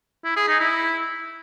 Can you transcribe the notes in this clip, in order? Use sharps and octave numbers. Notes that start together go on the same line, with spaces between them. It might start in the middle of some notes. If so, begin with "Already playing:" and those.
E4
G#4
D#4
E4